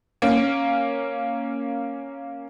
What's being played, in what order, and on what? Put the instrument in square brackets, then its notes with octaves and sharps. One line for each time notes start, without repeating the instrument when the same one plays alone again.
[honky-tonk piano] A#3 C#4